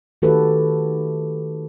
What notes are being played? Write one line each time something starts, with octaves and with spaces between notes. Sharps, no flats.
D#3 A3 F#4 G4 A4 B4